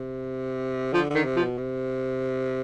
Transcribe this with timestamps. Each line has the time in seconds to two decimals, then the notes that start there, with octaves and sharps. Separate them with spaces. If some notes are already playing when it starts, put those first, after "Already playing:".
Already playing: C3
0.93 D3 F3
1.10 D3 D#3
1.25 C3
1.36 F3
1.41 B2
1.58 C3